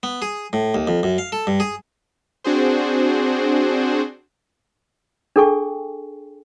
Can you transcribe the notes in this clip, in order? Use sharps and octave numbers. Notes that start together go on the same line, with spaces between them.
B3
G#4
A2
D#2
F2
F#2
F5
A4
G2
G#4
C4 D4 F#4 G#4 C5
D4 G#4 A4 G5 G#5 C#6